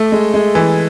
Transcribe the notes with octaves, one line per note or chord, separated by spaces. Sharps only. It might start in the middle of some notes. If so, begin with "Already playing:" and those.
Already playing: A3
G#3
G#3
E3